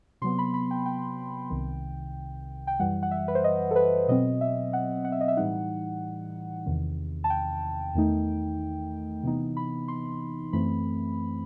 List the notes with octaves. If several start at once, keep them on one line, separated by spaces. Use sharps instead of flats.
C3 F#3 B3 C6
B5
B5
G5
G5
C2 C3 D#3
G5
F#2 E3 G3 F#5
F#5
E5
B4
C5
D#5
A4
B4
B2 F#3 C4 D#5
E5
F#5
F#5
E5
D#5
E5
A2 E3 G3 D#4 F#5
E2 C3 D#3
A5
G5
E2 D#3 A3 D#4
C3 E3 B3 D#4
B5
C6
F#2 E3 A3 C4 B5